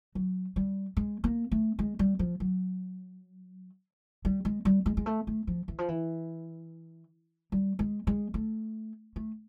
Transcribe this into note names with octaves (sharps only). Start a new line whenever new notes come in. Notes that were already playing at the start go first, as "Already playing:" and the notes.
F#3
G3
G#3
A#3
A3
G#3
G3
F3
F#3
G3
G#3
G3
G#3
G#3
A3
A3
F3
E3
F3
E3
G3
G#3
G#3
A3
A3